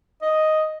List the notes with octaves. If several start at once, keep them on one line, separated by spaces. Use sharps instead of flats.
D#5